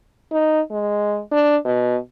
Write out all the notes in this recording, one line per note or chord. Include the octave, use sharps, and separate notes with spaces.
D#4
G#3
D4
B2